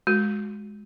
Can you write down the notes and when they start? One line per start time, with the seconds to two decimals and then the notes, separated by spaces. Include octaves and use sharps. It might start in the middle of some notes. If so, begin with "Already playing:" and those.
0.07 G#3 F#4